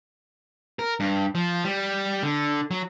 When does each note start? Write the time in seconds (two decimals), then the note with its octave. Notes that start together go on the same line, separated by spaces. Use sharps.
0.79 A#4
1.00 G2
1.35 F3
1.64 G3
2.23 D3
2.71 F#3